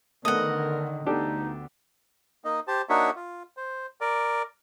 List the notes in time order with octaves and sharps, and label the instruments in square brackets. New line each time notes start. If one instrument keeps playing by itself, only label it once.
[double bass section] D3 D#3 [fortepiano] A3 B3 [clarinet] A#4 [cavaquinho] D#5 F#5
[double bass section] D2 B3 [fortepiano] D4 G4 A4 [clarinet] D#4
[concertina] A#3 D#4 D#5
G4 C5 A5
A#3 D4 D#4 F#4 C#5 E5
F4
C5
A#4 D5